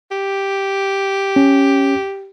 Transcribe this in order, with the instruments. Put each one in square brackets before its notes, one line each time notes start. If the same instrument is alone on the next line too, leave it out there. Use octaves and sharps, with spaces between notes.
[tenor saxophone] G4
[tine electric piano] C#4